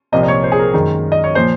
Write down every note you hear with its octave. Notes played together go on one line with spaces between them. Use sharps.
C2 A#2 F3 A#3 D#5
D#5
C#5
C5
G#4
A#4
F#2 D#3 G#3
D#5
C#5
A#2 F3 C5